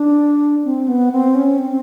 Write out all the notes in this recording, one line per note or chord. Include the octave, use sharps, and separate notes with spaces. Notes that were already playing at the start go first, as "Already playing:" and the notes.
Already playing: D4
C4
B3
C4
C#4
C4